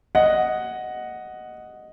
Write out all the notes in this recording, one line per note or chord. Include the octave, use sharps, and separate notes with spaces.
D#5 F#5